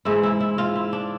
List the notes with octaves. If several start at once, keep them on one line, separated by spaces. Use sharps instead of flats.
G#2 E3 E4
E4
E4
F4
E4
D4